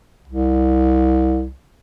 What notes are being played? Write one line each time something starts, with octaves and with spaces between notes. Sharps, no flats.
C2